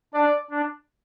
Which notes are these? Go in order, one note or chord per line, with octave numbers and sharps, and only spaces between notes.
D4 D5
D4